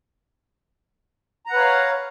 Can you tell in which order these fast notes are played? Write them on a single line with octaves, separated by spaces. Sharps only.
A#5 F#5 B4 C#5 F5